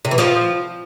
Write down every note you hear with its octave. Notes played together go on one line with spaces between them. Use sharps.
C3
E3
F3